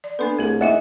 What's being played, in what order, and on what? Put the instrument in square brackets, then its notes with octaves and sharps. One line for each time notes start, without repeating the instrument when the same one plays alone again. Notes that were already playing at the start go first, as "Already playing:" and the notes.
[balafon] D5
[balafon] A#3 D4 A4 [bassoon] B3
[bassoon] C2 [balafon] A3 G#4
[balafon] A#3 D#4 E4 [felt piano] D#5 E5 F#5